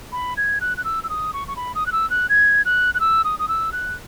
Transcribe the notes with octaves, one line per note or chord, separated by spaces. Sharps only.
B5
G#6
F#6
F#6
E6
E6
D#6
C#6
C#6
B5
D#6
F#6
E6
F#6
G#6
F#6
F#6
E6
D#6
D#6
E6
F#6